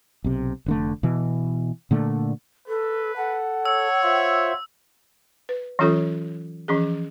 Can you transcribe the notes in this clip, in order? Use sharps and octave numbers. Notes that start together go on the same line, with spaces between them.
B1 C3
F1 D3 A3
B2 E3
A#2 D3 A3
A4 B4
A4 F#5
C#5 E6
F4 C5 E5
B4
E3 F#3 C#4 F4 A4 C#5
E3 F3 C#4 G#4